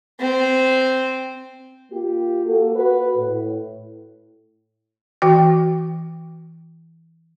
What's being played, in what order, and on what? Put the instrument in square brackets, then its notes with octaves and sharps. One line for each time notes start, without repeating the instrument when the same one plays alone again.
[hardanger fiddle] C4
[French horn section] A#3 F4 G4
A#3 F#4 A4
F#4 B4
A2
[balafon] E3 F#4 G5